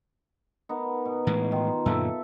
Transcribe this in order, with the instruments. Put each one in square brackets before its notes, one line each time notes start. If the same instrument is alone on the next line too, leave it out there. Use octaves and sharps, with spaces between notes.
[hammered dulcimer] B3 D#4 A#4
B2
[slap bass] A2 E3 G#3
[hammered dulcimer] D#3 F4
[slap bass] F#2 A#2 D3 [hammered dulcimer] A4 E5